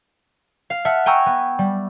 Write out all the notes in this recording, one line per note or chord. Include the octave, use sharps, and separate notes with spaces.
F5
E5 F#5 A5 F6 C#7
G5 G#5 A#5 C#6 E6
B3
G3